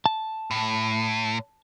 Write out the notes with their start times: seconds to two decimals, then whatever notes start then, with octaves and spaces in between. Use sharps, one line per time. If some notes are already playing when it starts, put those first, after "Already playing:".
0.06 A5
0.51 A2